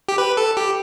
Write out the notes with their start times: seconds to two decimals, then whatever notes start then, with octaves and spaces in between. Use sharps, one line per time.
0.09 G4
0.18 B4
0.37 A4
0.57 G4